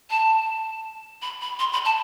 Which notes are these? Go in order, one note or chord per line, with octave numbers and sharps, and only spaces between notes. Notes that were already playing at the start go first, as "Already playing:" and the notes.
A5
B5
B5
C6
B5
A5